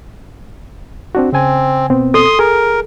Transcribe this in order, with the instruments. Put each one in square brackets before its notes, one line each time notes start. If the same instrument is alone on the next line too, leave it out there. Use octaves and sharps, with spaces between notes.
[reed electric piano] C4 D4 F#4
[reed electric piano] C#3 G#5 [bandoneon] C4
[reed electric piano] B2 B3 C4
[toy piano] A4 [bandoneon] C6 D#6
[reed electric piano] G#4 [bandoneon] A#4